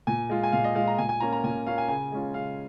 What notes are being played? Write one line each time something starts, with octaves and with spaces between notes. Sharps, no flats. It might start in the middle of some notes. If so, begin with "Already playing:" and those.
A#2 G#5
G#3 F4
G#5
A#2 F5
D#5
G#3 F4 F5
A#5
A#2 G#5
G#5
A#3 C#4 F4 A#5
A#5
A#2 G#5
A#3 C#4 F4 F5
G#5
C#3 G#5
G#3 C#4 F4
C#3 F5